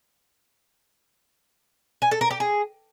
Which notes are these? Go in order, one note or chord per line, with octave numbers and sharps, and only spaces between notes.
G#5
A4
A#4
G4
G#4